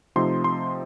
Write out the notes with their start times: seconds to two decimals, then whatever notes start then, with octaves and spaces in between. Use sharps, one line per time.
0.16 C3 F3 A3 C4 D#4 C6
0.44 C6